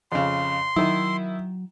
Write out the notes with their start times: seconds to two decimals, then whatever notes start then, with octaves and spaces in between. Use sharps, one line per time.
0.12 F2 C#3 C6
0.76 D#3 F#3 E4